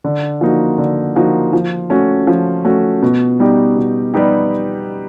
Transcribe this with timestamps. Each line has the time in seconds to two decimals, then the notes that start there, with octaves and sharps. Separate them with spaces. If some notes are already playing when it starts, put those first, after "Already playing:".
0.04 D3
0.41 F3 A#3 D#4 F#4
0.78 D3
1.16 F3 A#3 D#4 F#4
1.53 F3
1.90 A3 C#4 F#4
2.27 F3
2.65 A3 C#4 F#4
3.02 B2
3.40 G3 B3 D#4 G4
3.76 B2
4.14 G3 B3 D#4 G4